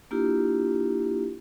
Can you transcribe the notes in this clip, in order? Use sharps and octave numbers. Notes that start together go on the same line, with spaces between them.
A#3 D4 E4 F4 G4